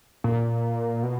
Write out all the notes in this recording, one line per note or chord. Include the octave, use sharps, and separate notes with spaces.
A#2
B2